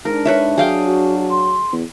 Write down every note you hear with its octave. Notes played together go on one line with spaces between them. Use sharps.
G#2 D4 A#4
B4 C#5 E5
F#3 G#4 F5 G5
F#4
C6
E2